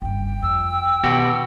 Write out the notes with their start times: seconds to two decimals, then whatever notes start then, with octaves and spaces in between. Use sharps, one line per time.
0.02 F#1 G2 G5
0.43 F2 E6
1.04 B2 D#3 F#4 G4